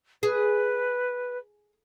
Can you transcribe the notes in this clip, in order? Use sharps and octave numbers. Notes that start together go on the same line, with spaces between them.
G#4 B4